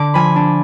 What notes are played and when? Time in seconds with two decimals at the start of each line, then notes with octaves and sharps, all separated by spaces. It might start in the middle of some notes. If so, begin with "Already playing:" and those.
Already playing: D3 D6
0.14 F3 G#5 B5
0.36 D4